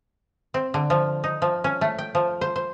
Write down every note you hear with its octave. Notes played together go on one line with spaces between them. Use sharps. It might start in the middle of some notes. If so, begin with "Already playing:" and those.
C4
D3
F3
D#4
F3
C#4
A3
G5
F3
C5
C5